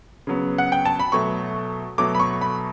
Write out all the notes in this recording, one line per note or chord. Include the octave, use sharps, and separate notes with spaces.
C#3 F#3 B3
F#5
G5
A5
B5
B2 F#3 A3 C#6
B2 F#3 A3 D6
B5
C#6
B5